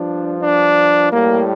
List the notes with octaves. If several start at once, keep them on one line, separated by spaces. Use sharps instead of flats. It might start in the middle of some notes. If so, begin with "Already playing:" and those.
Already playing: G2 F3 D4
D4
A2 G3 A#3